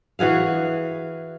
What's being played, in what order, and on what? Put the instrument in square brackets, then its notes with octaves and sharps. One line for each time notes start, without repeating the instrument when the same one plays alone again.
[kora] E3 F#4 G#4 F5